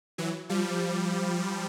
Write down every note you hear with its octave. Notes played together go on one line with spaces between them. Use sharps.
E3 F#3
F3 G3